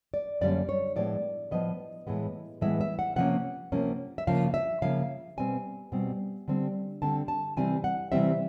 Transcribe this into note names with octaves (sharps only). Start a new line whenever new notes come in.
D5
F#2 D3 G3 A#3 C#4 D5
C#5
A2 F3 G#3 B3 D5
A2 F3 G#3 B3 D#5
A2 E3 G#3 B3
A2 E3 G#3 B3 E5
E5
F#5
C3 F3 A#3 C#4 F#5
C3 F3 A#3 C#4
E5
C#3 F3 A#3 F5
E5
C#3 F3 A#3 F5
B2 G3 C4 G#5
B2 G3 C4
D3 G3 C4
D3 G3 C4 A5
A5
C3 E3 G3 C4 G#5
F#5
C3 E3 G3 C4 E5